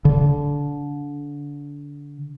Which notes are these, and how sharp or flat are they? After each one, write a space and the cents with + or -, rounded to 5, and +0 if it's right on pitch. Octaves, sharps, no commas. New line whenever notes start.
D3 -25